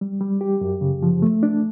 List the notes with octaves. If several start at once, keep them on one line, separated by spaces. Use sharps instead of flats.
G3
G3
G4
F#2
C#3
F3
A3
D4